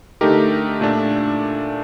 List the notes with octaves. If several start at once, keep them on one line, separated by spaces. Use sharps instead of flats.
D3 A3 D#4 G4 A#4
A#2 A3 D4